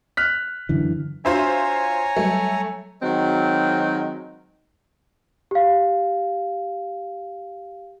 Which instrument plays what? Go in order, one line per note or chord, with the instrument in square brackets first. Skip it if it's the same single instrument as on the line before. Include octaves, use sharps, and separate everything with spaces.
[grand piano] F6 F#6 B6
[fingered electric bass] F#2 D3 E3
[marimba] D4 F#4 [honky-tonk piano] F4 C5 E5 [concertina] C#5 G#5 A#5
[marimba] F#3 G3 [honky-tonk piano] A3
[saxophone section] D#3 F#3 G#3 C4
[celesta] G4 F5